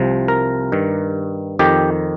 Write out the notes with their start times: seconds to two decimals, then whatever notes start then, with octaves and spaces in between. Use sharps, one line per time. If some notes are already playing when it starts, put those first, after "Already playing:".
Already playing: C2 C3 F3
0.28 A#4
0.72 G2 D#3
1.59 F2 D#3 G4